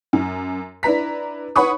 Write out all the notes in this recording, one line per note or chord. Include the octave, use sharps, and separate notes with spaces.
F#2
D4 E4 B4 A#5 B6
B4 C#5 F#5 B5 C#6 D#6